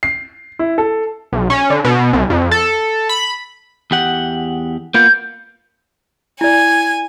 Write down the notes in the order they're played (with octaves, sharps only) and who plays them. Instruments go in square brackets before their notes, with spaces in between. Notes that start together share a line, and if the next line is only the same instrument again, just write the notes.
[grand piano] C7
E4
A4
[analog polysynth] B1
C#4
D3
B2
C2
F2
A4
B5
[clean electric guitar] E2 G4 F#5
[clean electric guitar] A#3 B3 F4 [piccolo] G6
[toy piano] E4 D5 [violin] G#5 [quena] G#6